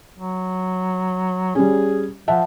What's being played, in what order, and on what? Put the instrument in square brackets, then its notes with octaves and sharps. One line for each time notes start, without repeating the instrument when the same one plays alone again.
[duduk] F#3
[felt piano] G3 C#4 [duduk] G#4
[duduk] F3 [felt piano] E5 F#5 A5